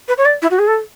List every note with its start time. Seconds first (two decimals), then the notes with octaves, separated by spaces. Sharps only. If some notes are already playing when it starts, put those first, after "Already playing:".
0.08 B4
0.18 C#5
0.25 D5
0.42 E4
0.51 F#4
0.59 G#4
0.67 A4